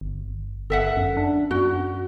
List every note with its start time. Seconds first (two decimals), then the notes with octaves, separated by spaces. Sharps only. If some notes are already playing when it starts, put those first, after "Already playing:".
0.01 G1
0.70 G1 A4 E5 F#5
0.97 F#2
1.17 D4
1.51 F#2 F#4